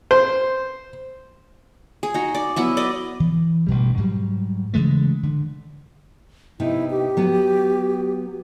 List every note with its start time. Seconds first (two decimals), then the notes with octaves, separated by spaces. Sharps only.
0.11 C5
2.03 G#4
2.14 D#4 F#4
2.34 D5
2.56 F#3 B3 E4
2.77 B4 D5 D#5
3.20 E3
3.67 A1 G2 B2 G3
3.97 G#2 F#3 G3
4.74 C#3 E3 G#3 A3
5.23 D3
6.60 C3 B3 D#4 E4
6.91 G4
7.17 F#3 B3